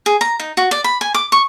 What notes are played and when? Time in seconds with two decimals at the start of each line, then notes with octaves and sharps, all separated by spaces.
0.06 G#4
0.21 A#5
0.40 D#4
0.57 F#4
0.71 D5
0.84 B5
1.01 G#5
1.14 D6
1.32 C#6